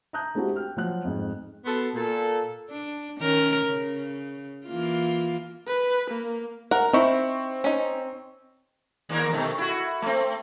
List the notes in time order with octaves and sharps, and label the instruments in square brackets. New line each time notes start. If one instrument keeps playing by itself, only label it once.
[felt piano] A5 A#5 D#6 F#6 G6
G#3 C4 D4 E4 F#4 G4
G5 F6
F3 F#3 F#6
F2 G#2
[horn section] B3 F#4 A4 C6
A#2 A4
[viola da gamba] D4
D#3 C#4 A#4
C#3
E3 A#3 F4
[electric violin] B4
A#3
[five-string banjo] A#4 F#5 [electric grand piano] A#5
[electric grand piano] C4 C#6 [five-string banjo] D#4 E4
[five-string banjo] C#4 D#4
[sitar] D#2 A#3 A#4
B2 D#3 A3
E4 F#4
A3 C4